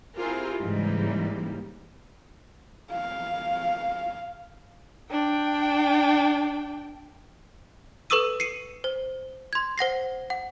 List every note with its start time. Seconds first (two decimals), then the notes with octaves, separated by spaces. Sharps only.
0.16 C4 E4 F4 G4 G#4 A#4
0.60 G#2 C#3 E3 G3 A#3 D#4
2.92 F5
5.11 D4 G5
8.10 A4 B4 C#6 D#6 E6 D#7
8.40 C7 C#7 D#7
8.84 C5
9.53 C6 G#6
9.78 C5 F#5 A#6 C7
10.30 F#5